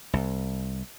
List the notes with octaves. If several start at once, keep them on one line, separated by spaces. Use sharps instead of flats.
C2